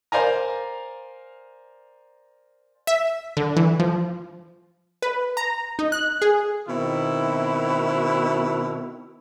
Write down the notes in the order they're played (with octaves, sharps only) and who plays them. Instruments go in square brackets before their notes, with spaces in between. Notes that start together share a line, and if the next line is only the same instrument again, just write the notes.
[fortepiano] A#4 C5 D5 F5 G#5 A#5
[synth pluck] E5
D3
E3
F3
[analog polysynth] B4
A#5
D#4
F#6
G#4
[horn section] B2 D#3 C4 E4